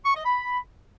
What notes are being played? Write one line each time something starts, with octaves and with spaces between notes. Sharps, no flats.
C#6
D#5
B5